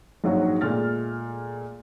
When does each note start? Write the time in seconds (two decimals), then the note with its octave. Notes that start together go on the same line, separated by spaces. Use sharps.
0.24 A#1 G#2 F#3 F#4
0.61 A#2 G#3 A3 F6 A6